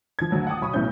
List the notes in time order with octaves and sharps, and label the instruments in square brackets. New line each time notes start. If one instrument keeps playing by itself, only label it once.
[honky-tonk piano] F3 G#6
A1 D2 F#3 A5
F#5 G5 A5 D6 D#6
B1 B5 C#6 D#6
B1 A2 E3 B3 C#4 G6